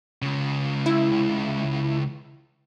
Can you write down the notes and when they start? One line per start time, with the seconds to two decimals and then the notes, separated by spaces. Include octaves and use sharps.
0.22 C#2 C#3
0.86 E4